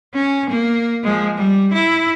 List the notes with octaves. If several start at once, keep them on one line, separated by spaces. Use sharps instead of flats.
C#4
A#3
F3 G#3
G3
E4